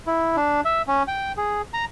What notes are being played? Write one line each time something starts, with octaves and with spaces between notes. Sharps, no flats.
E4
D4
E5
C#4
G5
G#4
A#5